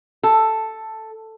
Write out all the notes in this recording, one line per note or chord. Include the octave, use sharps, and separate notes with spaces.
A4